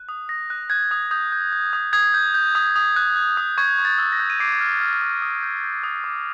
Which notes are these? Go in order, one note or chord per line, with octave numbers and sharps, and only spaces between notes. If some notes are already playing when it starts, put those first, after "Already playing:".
Already playing: F#6
D#6
D#6 A#6
F#6
F#6 G#6
D#6
D#6 G6
G6
G6
D#6
D#6 G#6
G6
G6
D#6
D#6
F#6
F#6
D#6
C#6 G#6
C#6
A6
E6
A#6
G6
D#7
D6 C7 D7
F6
F6
D6
D#6
G6
G6
D#6
D6